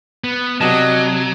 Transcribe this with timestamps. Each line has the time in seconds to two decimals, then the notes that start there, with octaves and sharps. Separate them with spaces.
0.24 B3
0.61 C3 F#3 F#4 A4 D5 D#5 A5